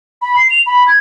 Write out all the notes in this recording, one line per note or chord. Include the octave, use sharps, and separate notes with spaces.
B5
C7
F7
B5
G#6